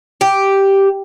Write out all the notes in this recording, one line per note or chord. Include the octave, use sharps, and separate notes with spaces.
G4